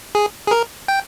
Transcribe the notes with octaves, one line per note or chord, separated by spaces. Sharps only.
G#4
G#4
A#4
G5